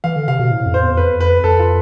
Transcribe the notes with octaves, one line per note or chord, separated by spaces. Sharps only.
E3 F5
D3
C3 F5
B2
A2
F2
C5
E2
F2 B4
B4
F2 A4
F4